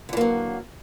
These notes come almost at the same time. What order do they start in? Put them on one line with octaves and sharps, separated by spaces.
D3 E3 A#3 F#3